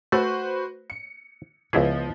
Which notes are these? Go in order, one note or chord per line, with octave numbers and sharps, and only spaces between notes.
A3 F#4 B4 C5
C#7
C#2 F3 B3 E4 G#4 D#5